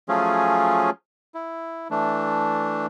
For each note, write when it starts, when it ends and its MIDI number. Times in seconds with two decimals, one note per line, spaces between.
0.09 0.90 53
0.09 0.90 54
0.09 0.90 57
0.09 0.90 61
0.09 0.90 65
0.09 0.90 68
1.34 1.88 64
1.90 2.86 52
1.90 2.86 57
1.90 2.86 62